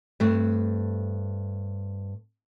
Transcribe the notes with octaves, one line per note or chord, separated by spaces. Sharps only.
G2 A3 C4